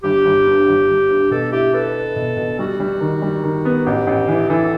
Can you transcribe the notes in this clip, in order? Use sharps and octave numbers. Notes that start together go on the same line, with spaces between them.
G1 G4
G1
G2
G1
G1
G2
B2 A4
E4 G4
A4 B4
B4
B2
B2
G3 F#4
G3
D#3
G3
D#3
B3
A1 G4
A1
E3
E3 A4